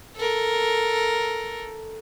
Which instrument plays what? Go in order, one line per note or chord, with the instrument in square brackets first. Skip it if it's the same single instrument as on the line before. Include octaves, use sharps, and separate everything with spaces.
[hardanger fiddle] A4 A#4